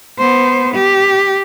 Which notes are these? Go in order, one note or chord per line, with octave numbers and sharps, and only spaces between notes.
B3 C5
G4